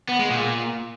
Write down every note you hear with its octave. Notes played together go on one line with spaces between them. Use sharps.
B3
G#3
A#2